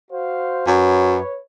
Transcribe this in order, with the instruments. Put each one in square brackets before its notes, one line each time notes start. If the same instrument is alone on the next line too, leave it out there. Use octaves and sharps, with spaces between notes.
[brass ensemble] F#4 C5 F5
[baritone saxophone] F#2 [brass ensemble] B4 C#5